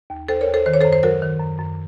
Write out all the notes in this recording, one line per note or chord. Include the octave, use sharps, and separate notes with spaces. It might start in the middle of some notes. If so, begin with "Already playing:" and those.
D#2
D#2 A4 C5
A#4 C#5
D#2
A4 C5
D#3 C5
C#5
A4 C5
F#2
C5
F#3 F#4 A#4
D#3
F#2
F#2